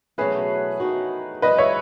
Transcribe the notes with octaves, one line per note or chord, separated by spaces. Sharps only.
E2 B2 F#3 A3 C#4 G#4 B4
E2 D#3 A3 D#4 F#4
F#2 E3 G#3 B4 D#5
C#5 E5